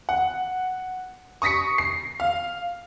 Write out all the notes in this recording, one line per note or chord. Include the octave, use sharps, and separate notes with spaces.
F#5
C#6 D#6 A#6 B6 C#7
C7
F5